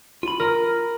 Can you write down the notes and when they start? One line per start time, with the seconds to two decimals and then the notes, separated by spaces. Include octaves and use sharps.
0.23 F4 B5
0.40 A#4